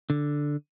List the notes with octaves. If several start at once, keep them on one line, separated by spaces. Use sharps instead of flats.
D3